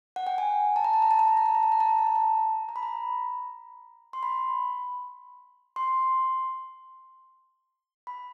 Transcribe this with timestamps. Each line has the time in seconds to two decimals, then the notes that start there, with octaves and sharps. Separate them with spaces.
0.16 F#5
0.27 G5
0.38 G#5
0.76 A5
0.84 A#5
0.93 A5
1.02 A#5
1.11 A5
1.19 A#5
1.28 A5
1.37 A#5
1.46 A5
1.55 A#5
1.63 A5
1.72 A#5
1.80 A5
1.89 A#5
1.98 A5
2.07 A#5
2.16 A5
2.69 A#5
2.76 B5
2.83 A#5
4.13 C6
4.23 B5
5.76 C6
8.07 B5